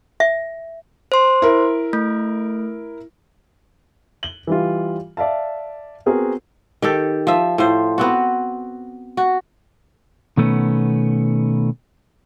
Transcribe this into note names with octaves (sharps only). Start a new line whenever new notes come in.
E5
C5 C6
E4 A#4
A3
F#7 G7
E3 G3 F4
D5 E5 F5 A5
B3 C4 F#4 G#4 A#4
D#3 G4 A4
F3 E5
A2 F3 C5
B3 C4 F#4
F#4
B2 D#3 A3 B3 C#4